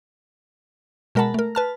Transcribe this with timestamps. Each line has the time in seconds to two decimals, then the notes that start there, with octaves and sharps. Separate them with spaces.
1.15 B2 G#3 A#4 F#5 A5 B5
1.34 A3 A#4
1.55 B4 A5 F6